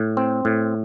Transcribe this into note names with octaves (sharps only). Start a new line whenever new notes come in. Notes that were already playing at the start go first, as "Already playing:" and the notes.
Already playing: A2
C4
A2